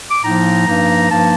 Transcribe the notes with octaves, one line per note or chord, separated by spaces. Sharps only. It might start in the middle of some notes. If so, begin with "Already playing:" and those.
D6
A2 F3 A#3 D#4 A#5
G2 F3 A#3 D#4
G2 F3 A#3 D#4 A5